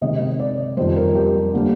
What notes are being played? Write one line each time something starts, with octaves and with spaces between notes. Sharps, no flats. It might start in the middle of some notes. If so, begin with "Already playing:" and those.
C3 D#3 G#3 C4 D#5
D5
F2 D#3 G3 C5
A#4
G4
D3 G3 A#3